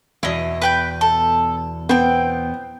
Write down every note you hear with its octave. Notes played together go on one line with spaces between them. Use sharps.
E2 B2 E4 D#5
B4 G5 G6
A4
B3 C4 G5